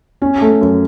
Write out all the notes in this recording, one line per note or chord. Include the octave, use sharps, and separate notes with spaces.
C#4
A3
F#2